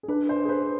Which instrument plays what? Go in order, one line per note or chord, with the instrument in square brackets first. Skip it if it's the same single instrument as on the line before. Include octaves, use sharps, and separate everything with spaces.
[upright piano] G#4
[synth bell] D4 [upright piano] B4
[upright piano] C5
G#4
[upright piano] B4 [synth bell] C5